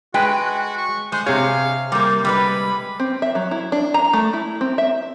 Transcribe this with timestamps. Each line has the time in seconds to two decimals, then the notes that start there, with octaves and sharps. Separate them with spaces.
0.14 G#3 F#4 B4 G5
0.78 C#6
1.12 G#3 C5
1.26 C3 G#4 C#5 F5
1.92 G3 A#3 C5
2.25 G3 G#3 B4 B5
3.00 C4
3.22 E5
3.35 F#3
3.51 E4
3.72 D4
3.94 A#5
4.13 A3
4.33 E4
4.61 C4
4.78 E5